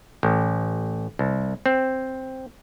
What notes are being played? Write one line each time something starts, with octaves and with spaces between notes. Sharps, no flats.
A1
C2
C4